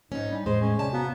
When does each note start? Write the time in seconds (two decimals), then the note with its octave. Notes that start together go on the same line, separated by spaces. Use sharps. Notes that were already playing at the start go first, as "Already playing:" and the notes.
0.12 G#2 C#4 D#4
0.31 G3 D4
0.46 E2 A2 G#3 C5
0.61 C#4
0.79 C3 C#5 D5 G#5 A5
0.93 B3 F#4 F5 A#5